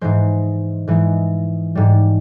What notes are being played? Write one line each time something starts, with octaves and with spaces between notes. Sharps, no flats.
G#2 E3 G#3 C5
G#2 E3 G#3
G#2 G3